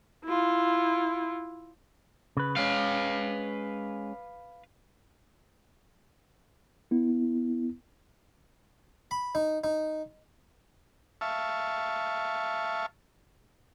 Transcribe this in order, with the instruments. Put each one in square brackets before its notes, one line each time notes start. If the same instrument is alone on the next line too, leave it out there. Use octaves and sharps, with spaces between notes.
[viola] E4 F4
[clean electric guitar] C#3 B4
[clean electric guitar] G#3 C#4 [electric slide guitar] B4 F5
[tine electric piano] B3 E4
[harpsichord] B5
D#4
D#4
[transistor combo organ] E5 F5 A5 C#6